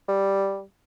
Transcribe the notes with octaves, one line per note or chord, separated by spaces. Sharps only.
G3